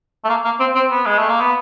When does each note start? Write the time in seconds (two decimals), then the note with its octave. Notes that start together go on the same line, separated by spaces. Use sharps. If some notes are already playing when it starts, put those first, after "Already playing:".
0.25 A3
0.29 A#3
0.45 A#3
0.60 C4
0.75 C4
0.90 B3
1.06 G#3
1.18 A3
1.29 A#3
1.41 B3